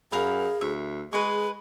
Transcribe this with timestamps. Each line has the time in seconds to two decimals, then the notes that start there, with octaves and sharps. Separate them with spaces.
0.12 F#2 G#4 A#4 F5 B5
0.61 D2 E5
1.13 G#3 G#4 B4 C#6